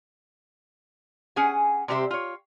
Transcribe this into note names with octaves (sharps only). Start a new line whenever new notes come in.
C#4 G#4 F#5 G#5
C3 G3 C4 G4 C5 E5
F4 C#5